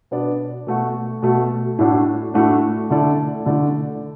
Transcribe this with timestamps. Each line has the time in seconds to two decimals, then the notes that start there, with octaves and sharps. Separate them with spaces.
0.11 B2 B3 D4 B4 D5
0.67 B2 A3 F#4
1.22 B2 A3 F#4
1.79 A2 A3 D4 F#4
2.34 A2 A3 D4 F#4
2.90 D3 A3 E4 A4 D5
3.45 D3 A3 E4 A4 D5